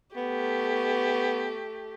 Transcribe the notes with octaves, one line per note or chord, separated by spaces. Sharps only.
A3 B3 G4